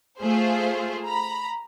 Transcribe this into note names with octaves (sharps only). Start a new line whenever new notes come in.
A3 F4 G#4 C5
A#5 B5